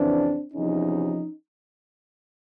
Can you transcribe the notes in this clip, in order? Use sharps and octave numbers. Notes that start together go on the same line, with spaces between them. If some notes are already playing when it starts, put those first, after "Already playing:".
Already playing: F2 C#3 E3 C4 D4
E2 C3 F3 C#4 D#4